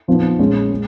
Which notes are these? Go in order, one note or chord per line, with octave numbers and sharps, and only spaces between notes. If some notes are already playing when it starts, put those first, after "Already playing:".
F2 F3 B3 D#4
A#1 A#2 G#3 C#4
G#3